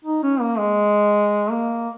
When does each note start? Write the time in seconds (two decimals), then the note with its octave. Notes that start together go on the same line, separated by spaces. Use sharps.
0.04 D#4
0.23 C#4
0.41 A#3
0.59 G#3
1.51 A#3